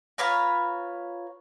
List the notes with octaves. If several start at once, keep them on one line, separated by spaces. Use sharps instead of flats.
F4 B4 C#5 A#5